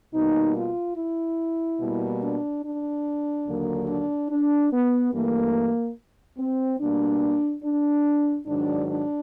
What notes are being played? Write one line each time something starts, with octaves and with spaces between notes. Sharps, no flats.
B2 G3 A#3 D#4
F4
E4
B2 G3 A#3
D4
D4
D#2 D3 F#3 A#3
D4
D4
B3
G2 E3 A3 A#3
C4
B2 G3 A#3 D4
D4
G#2 D#3 F#3 D4
D4